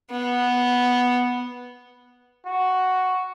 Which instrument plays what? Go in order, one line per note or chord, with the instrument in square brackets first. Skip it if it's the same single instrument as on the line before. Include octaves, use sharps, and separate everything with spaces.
[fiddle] B3
[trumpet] F#4